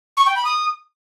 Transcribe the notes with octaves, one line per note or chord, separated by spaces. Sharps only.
C#6
G5
B5
D#6